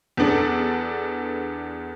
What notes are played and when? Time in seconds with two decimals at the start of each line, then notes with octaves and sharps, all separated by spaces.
0.17 E2 B3 D4 A4